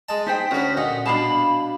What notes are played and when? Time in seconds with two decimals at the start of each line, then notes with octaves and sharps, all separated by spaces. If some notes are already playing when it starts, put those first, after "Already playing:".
0.09 G#3 D#5 A5
0.27 D#4 C5 G5 B6
0.51 D2 B3 C#4 F#4 B6
0.77 A#2 D#5 F#5 D#6
1.06 B2 D4 F5 A5 B5